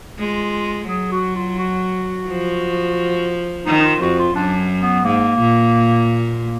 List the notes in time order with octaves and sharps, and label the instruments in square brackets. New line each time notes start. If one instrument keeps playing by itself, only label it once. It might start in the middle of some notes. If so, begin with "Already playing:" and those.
[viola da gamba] G#3 [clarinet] F4
[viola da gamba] F#3 [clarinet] G#4
[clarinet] F#4
F4
F#4
[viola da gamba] F3
[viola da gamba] D#3 [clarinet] D#4
[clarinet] D#4
F4
[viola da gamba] F2 [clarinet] F#4
[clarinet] F4
[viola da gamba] F#2 [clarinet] D4
[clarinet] B3
[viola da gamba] G#2 [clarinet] A#3
[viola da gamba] A#2
[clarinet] A#3